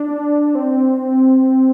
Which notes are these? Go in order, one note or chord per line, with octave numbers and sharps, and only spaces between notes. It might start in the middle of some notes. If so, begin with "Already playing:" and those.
Already playing: D4
C4